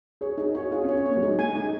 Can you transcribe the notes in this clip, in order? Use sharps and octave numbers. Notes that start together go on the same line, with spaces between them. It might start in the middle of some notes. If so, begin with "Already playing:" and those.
G#4 C#5
D#4 G#4
F#4 C#5
F4 G#4
C#4
C#5
C#4
A#3 C#5
F#3
G#3 D#4
A#3 G#5
G#3 D#4